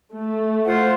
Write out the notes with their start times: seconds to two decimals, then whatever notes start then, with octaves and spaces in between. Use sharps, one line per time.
0.13 A3
0.65 F4 C5 F#5